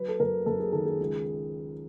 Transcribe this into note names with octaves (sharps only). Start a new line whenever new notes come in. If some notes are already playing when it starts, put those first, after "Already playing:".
Already playing: F#3 B4
A4
F#2 A#4
F#2 A4
G#4
D#3 A4
G#4
C#2